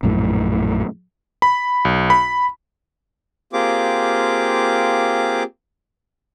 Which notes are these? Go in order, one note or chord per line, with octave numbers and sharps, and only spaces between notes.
A#1 F#2 A2
B5
B1
B5
A#3 C4 F4 G4 G#4 D6